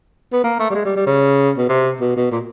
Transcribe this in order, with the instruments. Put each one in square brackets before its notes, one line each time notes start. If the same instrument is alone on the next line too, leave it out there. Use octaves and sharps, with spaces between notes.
[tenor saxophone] B3
A#3
A3
G3
G#3
G3
G3
C#3
B2
C3
B2
B2
A#2